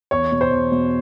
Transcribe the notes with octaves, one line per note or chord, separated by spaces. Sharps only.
E2 C#5 C#6
B2
C5 C6
E2
B2